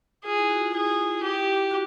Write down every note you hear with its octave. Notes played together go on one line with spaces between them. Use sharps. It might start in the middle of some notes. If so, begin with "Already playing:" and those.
F4 G#4
E4
F#4
F4
E4 G#4
G4
F#4